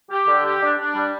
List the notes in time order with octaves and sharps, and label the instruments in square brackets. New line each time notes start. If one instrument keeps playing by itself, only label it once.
[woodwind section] G4
D3
G4
D4
D4
G3